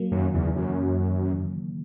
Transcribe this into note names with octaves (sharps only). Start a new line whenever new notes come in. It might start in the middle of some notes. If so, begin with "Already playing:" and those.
Already playing: F#3 A#3
F#2 D#3 F#3
E2 C#3 E3
F#2